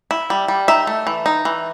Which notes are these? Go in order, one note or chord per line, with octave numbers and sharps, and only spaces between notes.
E4
G3
G3
D#4 E5
A3
E3
D#4
E3